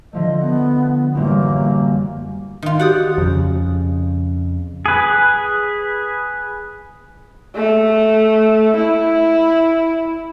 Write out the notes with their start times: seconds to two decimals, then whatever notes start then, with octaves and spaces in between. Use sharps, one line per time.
0.13 D3 F3 A3 D#5
0.41 B3 F#5
1.15 A1 F#2 G3 A#3
2.62 D#3 F4
2.79 F#4 G4 D5 F#5 D#6
3.18 F2 C#3
4.86 G#4 B4
7.55 A3
8.77 E4